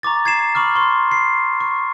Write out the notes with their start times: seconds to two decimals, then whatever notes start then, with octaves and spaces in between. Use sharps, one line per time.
0.03 A#5 C#6 D6 A6
0.25 G#6 C7 E7
0.55 B5 C#6 D6 F6
0.76 C6 C#6
1.11 C7
1.61 C#6